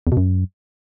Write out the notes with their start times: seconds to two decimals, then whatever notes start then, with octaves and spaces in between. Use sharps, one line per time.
0.07 E2
0.12 B2
0.17 F#2